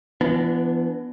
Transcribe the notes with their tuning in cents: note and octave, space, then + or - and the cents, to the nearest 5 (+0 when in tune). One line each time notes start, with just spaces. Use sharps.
E3 +35 B3 +0 D4 -5